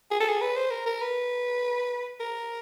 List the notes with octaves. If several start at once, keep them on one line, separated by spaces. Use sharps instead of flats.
G#4
A4
G#4
B4
C5
A#4
A#4
B4
A#4